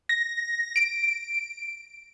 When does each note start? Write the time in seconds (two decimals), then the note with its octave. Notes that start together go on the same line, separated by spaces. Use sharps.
0.09 A#6
0.76 D7